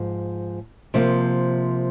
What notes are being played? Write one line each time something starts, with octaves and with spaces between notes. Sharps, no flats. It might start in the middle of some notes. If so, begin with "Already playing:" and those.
Already playing: G#2 F3
C3 F3 A#3